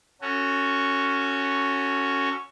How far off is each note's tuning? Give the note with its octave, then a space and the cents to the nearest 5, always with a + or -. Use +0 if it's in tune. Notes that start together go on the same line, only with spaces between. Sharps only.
C#4 +0 F#4 +0 A4 +30